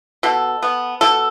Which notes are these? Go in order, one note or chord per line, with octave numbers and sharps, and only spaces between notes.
B2 A4
B3
B2 A4